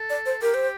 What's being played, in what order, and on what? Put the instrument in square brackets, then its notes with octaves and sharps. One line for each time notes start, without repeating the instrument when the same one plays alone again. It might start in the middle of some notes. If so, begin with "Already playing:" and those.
Already playing: [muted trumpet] A4
[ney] D5
C5
[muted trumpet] G4 [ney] A#4
[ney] C5